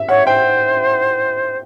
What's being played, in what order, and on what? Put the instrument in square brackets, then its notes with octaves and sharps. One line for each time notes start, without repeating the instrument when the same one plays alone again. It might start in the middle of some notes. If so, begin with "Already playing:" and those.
Already playing: [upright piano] E5
[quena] C#5 [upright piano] F#5
[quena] C5 [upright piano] G5